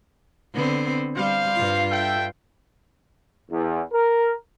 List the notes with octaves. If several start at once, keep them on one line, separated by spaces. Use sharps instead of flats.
D3 B3 C4
G3 C5 F5
G2 F4
A4 E5 G5
E2
A#4